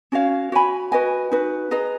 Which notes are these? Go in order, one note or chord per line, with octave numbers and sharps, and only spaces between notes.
C#4 F#4 C#5 F5
F#4 C#5 G#5 B5
F#4 B4 D#5 G#5
D#4 F#4 B4
G#4 B4 D#5 A#5